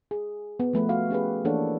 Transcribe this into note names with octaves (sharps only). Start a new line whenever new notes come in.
G#4
B3
F3 A3 B4
F#4 F5
C#4 G4 G#4 B4
E3 A#3 D4 A4 C#5 F#5